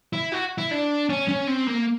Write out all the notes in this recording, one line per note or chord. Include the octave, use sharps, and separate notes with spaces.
E4
F#4
E4
D4
C#4
C#4
C4
A#3